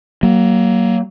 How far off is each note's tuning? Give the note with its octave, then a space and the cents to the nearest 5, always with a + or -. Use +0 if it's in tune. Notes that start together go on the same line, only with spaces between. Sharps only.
F#3 +25 A#3 +0